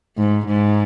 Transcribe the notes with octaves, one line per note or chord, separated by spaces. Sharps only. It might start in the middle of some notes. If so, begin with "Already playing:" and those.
G#2
G#2